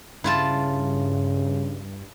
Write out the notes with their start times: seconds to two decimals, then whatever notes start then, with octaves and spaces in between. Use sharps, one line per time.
0.24 G2 C#3 E4 F4 A5